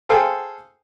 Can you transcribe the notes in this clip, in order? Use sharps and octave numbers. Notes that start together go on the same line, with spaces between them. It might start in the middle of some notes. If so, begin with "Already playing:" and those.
G#4 A4 C5 F5 G5 G#5